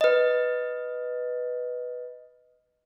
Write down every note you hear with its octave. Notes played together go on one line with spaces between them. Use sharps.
B4 D#5